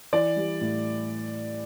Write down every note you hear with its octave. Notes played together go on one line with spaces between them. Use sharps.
E3 D5
G3
A2